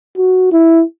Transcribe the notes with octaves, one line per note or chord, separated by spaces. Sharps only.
F#4
E4